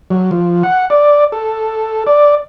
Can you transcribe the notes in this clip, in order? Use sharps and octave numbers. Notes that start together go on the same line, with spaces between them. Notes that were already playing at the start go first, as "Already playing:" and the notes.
F#3
F3
F#5
D5
A4
D5